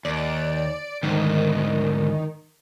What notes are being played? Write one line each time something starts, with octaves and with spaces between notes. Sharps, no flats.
D#2 D5
D2 G#2 D#3